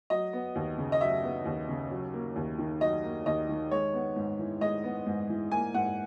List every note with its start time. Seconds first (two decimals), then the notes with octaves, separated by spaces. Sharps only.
0.10 F#3 D#5
0.33 B3
0.55 D#2
0.78 C#3
0.92 D#5
1.01 F#3 E5
1.23 B3
1.45 D#2
1.68 C#3
1.91 F#3
2.13 A#3
2.36 D#2
2.58 D#3
2.81 F#3 D#5
3.04 A#3
3.26 D#2 D#5
3.49 D#3
3.71 G#3 C#5
3.93 B3
4.16 G#2
4.39 E3
4.61 G#3 D#5
4.84 B3
5.06 G#2
5.29 E3
5.51 A#3 G#5
5.74 G#2 F#5